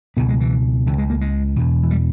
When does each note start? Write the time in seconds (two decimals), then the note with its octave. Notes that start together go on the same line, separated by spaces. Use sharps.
0.17 C#2 B2 B3
0.29 G#3
0.40 E3
0.87 C#2 C#3 E3
0.98 G#3
1.10 A#3
1.21 G#3
1.56 E2 B2
1.83 E3
1.91 G3